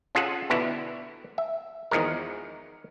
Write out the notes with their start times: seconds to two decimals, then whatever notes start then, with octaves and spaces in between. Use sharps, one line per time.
0.15 C#4 F4 G#4 A4 F#5
0.50 B2 D3 B3 E4
1.38 E5
1.91 E2 D#3 F3 G#3 A#4